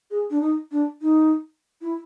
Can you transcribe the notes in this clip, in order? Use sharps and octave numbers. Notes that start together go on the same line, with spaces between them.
G#4
D4
D#4
D4
D#4
E4